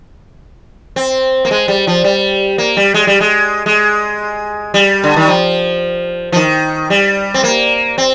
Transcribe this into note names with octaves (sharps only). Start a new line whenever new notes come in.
C4
A#3
G#3
G3
F3
G3
A#3
G3
G#3
G3
G#3
G#3
G3
D3
D#3
F3
F3
D#3
G3
C4
A#3
C4